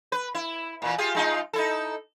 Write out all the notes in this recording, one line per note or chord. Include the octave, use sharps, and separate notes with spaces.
B4
E4
A#2 E3
F4 G4 G#4
G#3 D#4 F4
D#4 E4 A4